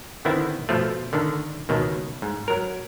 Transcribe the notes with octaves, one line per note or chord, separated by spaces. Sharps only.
D3 D#3 B3 C4 E4
B2 F3 A3
D3 D#3 D4
C#2 B2 D#3
G#2
F#3 A#4